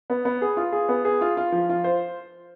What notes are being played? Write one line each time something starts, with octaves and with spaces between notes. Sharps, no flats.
B3
B3
G#4
F4
G#4
B3
G#4
F4
F4
F3
F4
C5